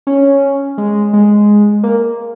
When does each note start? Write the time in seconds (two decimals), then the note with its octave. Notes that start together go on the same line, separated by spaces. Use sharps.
0.07 C#4
0.78 G#3
1.13 G#3
1.83 A#3